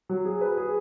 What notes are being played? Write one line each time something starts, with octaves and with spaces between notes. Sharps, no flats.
F#3
G#4
B4
G#4